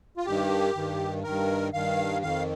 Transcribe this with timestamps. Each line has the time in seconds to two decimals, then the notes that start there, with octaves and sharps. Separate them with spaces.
0.17 F4
0.26 G2 D#3 G4
0.75 G2 D#3
1.24 G2 D#3 A#4
1.73 G2 D#3 F5
2.22 F2 D#3 F5